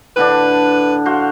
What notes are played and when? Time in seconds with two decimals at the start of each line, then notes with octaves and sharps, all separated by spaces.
0.17 A2 D3 D4 B4
1.05 F#4 C5 F5